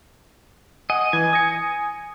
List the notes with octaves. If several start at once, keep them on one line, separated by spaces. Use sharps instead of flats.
D#5 F#5 G#5
E3 G#5
D#6 A#6 C#7